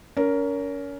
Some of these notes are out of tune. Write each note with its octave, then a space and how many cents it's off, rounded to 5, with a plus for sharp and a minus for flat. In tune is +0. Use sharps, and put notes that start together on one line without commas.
C#4 +30 A#4 +0